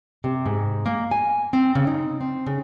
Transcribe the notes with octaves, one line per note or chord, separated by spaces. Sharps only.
C3
G#2
A#3
G#5
C4
C#3
D#4
C4
C#3